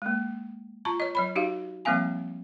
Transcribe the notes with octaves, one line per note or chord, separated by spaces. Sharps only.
G#3 A#3
F4 A5 A#5 C#6
C#5 D#5
F#3 C#5 B5
D#4 F#4 G4 F5
F3 G3 A#3 C4 F5 G#5